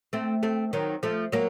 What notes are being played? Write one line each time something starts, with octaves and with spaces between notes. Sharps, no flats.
A3 C4
A3 C4
D#3 F#3
F3 A3
F#3 A#3